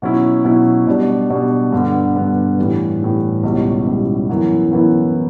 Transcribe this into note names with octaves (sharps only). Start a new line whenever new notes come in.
B2 F#3 C#4 E4
B2 F#3 C#4 E4
B2 G3 D4
B2 G3 D4
G2 D3 G3 B3
G2 D3 G3 B3
A2 E3 G3
A2 E3 G3
C#2 B2 G3 C#4 E4
C#2 B2 G3 C#4 E4
F#2 E3 B3 E4
F#2 E3 B3 E4